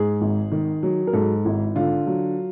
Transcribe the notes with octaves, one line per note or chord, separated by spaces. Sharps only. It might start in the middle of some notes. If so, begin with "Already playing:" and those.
Already playing: G#2 G#4
G#1
D#3
F#3
A#4
G#2 A4
G#1 E4
D3 F4
F#3